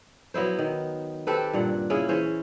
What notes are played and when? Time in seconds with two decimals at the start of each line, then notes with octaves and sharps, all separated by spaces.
0.34 F#3 B3 E4 C5
0.59 D#3
1.27 C4 G4 A4 B4
1.53 G2 A#2 F#5
1.90 C#3 C#4 E4 G#4
2.09 E3 C#4 C5